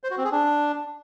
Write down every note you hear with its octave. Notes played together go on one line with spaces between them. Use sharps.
C5
F#4
C4
G#4
D4